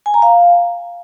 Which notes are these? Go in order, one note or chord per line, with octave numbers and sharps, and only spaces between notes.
G#5
A#5
F5